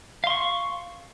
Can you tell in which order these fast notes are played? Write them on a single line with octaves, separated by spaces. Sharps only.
F5 C6 C#6